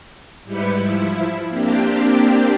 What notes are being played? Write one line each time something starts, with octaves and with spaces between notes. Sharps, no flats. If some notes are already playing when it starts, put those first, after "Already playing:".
G#2 G3 E4 G4 B4 C#7
F3 E4
A#3 C4 D4 G4